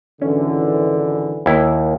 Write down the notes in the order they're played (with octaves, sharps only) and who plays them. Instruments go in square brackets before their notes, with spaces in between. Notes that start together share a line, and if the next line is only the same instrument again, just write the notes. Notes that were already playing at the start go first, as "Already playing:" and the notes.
[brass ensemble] G#1 D3 E3 [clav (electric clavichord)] C#4
[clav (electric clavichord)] D#2 E4